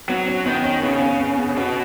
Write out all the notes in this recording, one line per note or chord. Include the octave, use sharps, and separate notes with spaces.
F#3 B3
C#4
D#3 B3
C#4
C#3 B3
C#4
B3
B3
B2 C#4